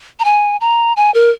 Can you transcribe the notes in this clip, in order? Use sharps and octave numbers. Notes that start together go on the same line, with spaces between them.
A#5
G#5
A#5
G#5
A#4